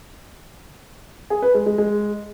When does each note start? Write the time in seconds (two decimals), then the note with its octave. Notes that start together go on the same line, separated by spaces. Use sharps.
1.30 G#4
1.42 B4
1.54 G#3
1.66 G#3
1.78 G#3